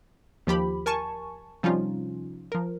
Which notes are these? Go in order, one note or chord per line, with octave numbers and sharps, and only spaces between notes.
D#2 F3 G4 B5
A#4 G#5 A5 C#6
C3 F3 G3 C#4 D#4 F4
F3 A#4